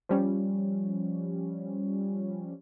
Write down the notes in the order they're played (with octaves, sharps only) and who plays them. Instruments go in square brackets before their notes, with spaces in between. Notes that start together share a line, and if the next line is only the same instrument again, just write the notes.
[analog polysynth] F3 G3 C#4